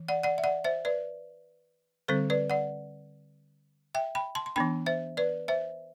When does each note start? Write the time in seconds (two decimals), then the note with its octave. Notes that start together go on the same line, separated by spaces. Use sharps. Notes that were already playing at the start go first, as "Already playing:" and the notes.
Already playing: E3
0.08 D5 F#5
0.23 D5 F#5
0.38 E5
0.44 D5 F#5
0.64 C5 E5
0.85 B4 D5
2.08 D3 G3 C4 A4 C5
2.30 B4 D5
2.50 D5 F#5
3.95 E5 G5
4.15 G5 B5
4.35 A5 C6
4.46 C6
4.56 E3 B3 D4 G5 B5
4.86 C5 E5
5.17 B4 D5
5.48 C5 E5